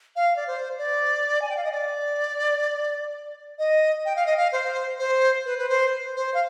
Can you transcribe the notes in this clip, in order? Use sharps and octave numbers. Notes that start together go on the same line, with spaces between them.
F5
D5
C5
D5
G#5
G5
F5
D#5
D5
D#5
G5
F5
D#5
F5
C5
C5
B4
B4
C5
C5
F5